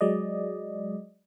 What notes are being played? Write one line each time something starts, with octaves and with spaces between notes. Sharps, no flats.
F#3 G#3 D5 D#5